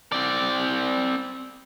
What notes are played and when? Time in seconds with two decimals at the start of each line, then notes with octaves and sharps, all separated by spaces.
0.12 C4 D5